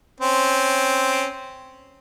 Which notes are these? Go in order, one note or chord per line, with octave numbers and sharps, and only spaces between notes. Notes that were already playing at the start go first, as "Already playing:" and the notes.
C4 C#4